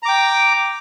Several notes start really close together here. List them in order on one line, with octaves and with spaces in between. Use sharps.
A#5 D6 G5